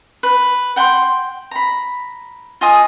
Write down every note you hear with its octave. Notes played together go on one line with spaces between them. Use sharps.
B4
F#5 G5 B5 C6
A#5 B5
F4 D#5 G#5 D#6